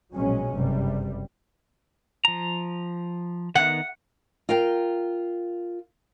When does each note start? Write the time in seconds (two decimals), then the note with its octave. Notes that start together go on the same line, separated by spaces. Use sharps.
0.14 A#1 B2 F#3 G#3 C#4
0.54 F#1 G2 C3 G3
2.25 F3 A#5
3.55 D#3 B3 F#5
4.49 F4 A#4 F5 G5